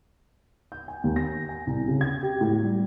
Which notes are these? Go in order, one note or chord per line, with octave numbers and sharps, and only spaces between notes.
G6
G#5
D#2
A#6
G#5
C2
C#3
G#6
G4
A2
G3